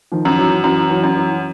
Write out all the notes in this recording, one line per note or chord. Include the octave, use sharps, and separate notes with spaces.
D#3 F3
F#2
E3 F#3
F#2 E3 F#3
E3 F#3
F#2
E3 F#3